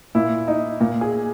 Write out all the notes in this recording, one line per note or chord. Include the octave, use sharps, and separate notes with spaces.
A#2 E4
D#4
A#2
G#4